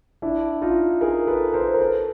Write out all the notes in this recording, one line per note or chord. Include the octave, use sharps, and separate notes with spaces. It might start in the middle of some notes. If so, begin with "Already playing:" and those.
D4 E4
D#4 F4
G#4 A#4
A4 B4
A#4 C5
A#4
A4 B4